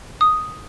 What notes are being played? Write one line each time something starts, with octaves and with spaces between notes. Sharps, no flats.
D#6